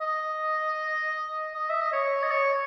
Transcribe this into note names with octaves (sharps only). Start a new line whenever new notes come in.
D#5
D#5
E5
D#5
C#5
D#5
C#5